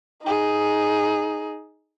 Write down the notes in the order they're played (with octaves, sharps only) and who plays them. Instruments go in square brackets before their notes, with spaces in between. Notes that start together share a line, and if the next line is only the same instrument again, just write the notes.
[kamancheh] D#4 G#4